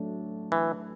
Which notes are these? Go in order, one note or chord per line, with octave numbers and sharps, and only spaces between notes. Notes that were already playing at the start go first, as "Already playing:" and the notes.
Already playing: F#3 A3 D4
E3